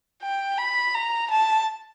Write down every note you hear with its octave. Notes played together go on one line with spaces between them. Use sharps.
G5
B5
A#5
A5